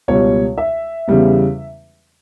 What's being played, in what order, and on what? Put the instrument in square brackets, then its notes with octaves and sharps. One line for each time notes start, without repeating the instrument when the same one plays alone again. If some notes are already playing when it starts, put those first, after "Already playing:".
[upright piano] C#2 B2 G3 C#5
E5
E2 C#3 G3 B3